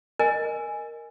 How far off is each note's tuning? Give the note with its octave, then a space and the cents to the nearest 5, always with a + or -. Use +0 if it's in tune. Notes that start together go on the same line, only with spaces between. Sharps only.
A#4 +0 D#5 -5 G#5 +0